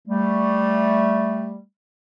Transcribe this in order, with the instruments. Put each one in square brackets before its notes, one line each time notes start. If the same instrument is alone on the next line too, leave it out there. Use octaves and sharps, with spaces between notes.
[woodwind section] G3 A3